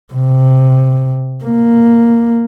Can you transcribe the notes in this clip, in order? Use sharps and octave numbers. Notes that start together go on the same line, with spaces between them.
C3
A#3